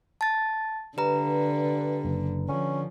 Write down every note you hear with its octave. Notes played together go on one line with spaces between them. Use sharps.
A5 A6
G2 D3 B4 A#5
F#1
D3 F3 C#4